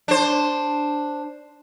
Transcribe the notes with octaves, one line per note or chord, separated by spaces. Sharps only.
D4 C5